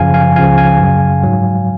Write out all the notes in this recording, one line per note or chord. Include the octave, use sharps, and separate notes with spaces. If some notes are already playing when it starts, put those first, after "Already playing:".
Already playing: F#2 C#3 F3 F5 G#5
F5 G#5
C#2 C#3 F3 F5 G#5
F5 G#5
F#2 C#3 F#3
G#2 F#3